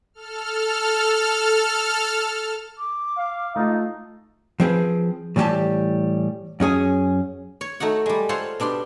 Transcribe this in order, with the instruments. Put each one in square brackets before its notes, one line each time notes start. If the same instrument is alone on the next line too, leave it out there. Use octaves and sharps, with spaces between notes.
[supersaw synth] A4 F6
[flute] D6
[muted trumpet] F5
[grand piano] A3 F4 [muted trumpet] D#4
[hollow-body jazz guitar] F3 C4 G#4 B4
A2 E3 G3 C#4 G4 A5
F#2 C#4 G#4 G#5
[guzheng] C#5
A3 D#4 F#4 F#5
G3 G#3
F4 A4 C5 C#5 F#5
B2 D4 G4 C6